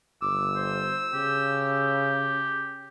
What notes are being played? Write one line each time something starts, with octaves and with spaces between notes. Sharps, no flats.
G1 D6 E6
C5
C#3 G4